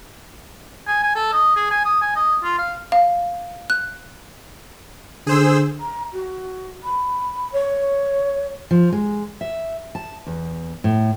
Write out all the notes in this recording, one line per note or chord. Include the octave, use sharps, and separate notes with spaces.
G#5
G#5
A4
D#5
G#4
G#5
D#6
G#5
D#5
F4
F5
F5
F#6
D3 G#4 C5 E6
A#5
F#4
B5
C#5
F3
G#3
E5
A5
E2
A2